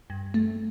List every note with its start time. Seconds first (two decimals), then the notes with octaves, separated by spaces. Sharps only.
0.10 G2
0.34 A3